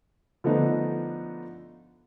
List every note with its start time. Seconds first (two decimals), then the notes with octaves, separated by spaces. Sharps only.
0.44 D3 F3 A3 B3 D#4